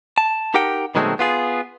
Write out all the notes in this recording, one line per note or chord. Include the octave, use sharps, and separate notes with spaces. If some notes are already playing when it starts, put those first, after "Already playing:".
A5
D#4 G4 A#4 F#5 G5
B2 D#3 F#3 G#3 A3 C4
B3 F4 G#4